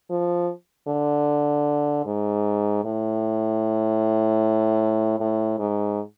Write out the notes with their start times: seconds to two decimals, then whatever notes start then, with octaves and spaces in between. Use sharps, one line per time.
0.10 F3
0.88 D3
2.06 G#2
2.85 A2
5.20 A2
5.59 G#2